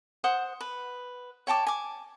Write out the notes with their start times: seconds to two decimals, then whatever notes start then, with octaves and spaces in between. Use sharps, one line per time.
0.24 C5 F#5 D#6
0.61 B4
1.47 C#5 G5 A5 D6
1.67 G#5 D6